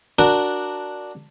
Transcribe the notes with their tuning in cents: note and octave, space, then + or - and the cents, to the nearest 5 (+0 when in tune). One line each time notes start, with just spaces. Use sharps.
D4 +0 F#4 +0 A#4 +0